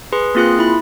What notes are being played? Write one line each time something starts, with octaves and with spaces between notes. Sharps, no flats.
G#4 B4 C6
A#3 C4 F4 G#4 C6 F#6
E4 B5